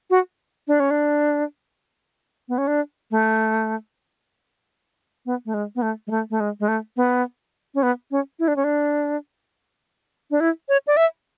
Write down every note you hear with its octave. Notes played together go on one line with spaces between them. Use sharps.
F#4
D4
C#4
D4
B3
C#4
D4
A3
B3
A3
G#3
B3
A3
G#3
A3
A3
G#3
G#3
A3
B3
C#4
B3
C#4
E4
D4
C#4
D4
D4
E4
C#5
D5
E5